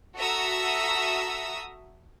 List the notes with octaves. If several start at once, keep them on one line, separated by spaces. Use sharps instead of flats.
F#4 A4 E5 A#5 D#6 E6